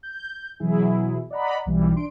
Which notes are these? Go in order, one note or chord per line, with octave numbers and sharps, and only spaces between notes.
G6
B2 E3 F#3 E4 G#4
D5 D#5 F#5 A#5 B5
B1 E3 G3
D4 C6 D7